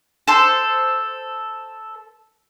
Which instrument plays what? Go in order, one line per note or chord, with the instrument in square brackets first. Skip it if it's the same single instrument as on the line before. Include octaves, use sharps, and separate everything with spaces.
[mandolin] A4 C5